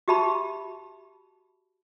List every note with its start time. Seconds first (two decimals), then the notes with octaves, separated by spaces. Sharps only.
0.08 F#4 G4 E5 A5 B5